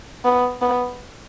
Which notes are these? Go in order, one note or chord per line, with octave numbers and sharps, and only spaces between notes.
B3
B3